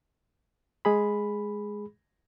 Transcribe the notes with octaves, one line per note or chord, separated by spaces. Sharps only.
G#3 G#4 B5